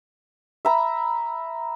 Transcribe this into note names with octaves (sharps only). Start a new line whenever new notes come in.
E5 A#5 B5